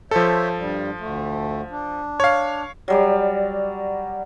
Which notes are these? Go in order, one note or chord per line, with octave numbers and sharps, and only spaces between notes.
F3 A4 C5 C#5 E5
G2 G3
D2 A3
D4
C#5 F5
F#3 G3 D5